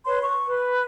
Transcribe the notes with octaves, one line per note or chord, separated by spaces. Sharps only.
B4 C#5 C6
C#6
B4